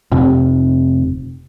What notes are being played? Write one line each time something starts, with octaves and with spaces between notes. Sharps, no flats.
F1 C3